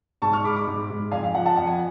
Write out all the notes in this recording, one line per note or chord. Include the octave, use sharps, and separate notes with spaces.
G#2 A5 C#6
C#6 F6
G#3 B5 D6
B5 D6
G#2
G#2
F2 F5 G#5
F5
F3 F#5
F#5 A5
F2 F#5
G#5